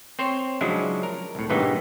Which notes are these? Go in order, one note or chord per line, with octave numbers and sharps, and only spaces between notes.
C4 C5 C#5
C#3 F3 F#3 G#3 D4 E4
A#4
C2 A2
G2 A#2 C#3 E3 B3 D#4